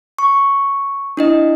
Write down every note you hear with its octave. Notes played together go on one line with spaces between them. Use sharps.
C#6
D4 E4 D#5